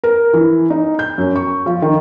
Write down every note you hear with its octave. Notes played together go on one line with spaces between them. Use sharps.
A#4
E3
D#4
G6
F#2
C#6
F3
D#3